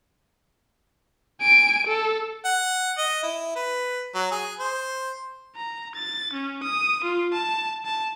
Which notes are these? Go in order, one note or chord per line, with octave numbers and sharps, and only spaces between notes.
G#5 D7
A4
F#5
D#5
E4
B4
F#3
G#4
C5
A#5
A6
C#4
D#6
F4
A5
A5